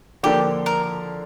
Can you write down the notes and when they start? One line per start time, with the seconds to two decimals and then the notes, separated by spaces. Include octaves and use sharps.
0.23 D3 F3 A#3 D4 G4 A4
0.66 A#4